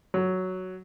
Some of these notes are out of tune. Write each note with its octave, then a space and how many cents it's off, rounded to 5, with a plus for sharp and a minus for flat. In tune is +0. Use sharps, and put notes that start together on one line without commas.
F#3 +5